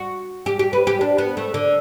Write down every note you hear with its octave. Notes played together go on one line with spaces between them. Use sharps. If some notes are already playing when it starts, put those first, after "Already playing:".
Already playing: F#4
G4
G4
B4
G4
D4
B3
A3
D3